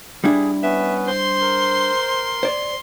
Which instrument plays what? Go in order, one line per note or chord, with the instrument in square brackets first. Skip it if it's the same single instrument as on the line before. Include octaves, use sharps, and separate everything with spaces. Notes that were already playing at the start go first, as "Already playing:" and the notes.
[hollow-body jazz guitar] G3 D4 E4 [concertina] G#4
[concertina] B3 C#4 B4 [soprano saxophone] E5
[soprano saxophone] C5 [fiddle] C6
[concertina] A#4
[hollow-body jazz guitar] C5 D5